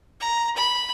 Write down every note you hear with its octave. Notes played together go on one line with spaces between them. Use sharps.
A#5
B5